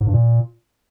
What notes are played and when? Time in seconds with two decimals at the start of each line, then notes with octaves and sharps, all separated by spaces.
0.01 G#2
0.07 G2
0.13 A#2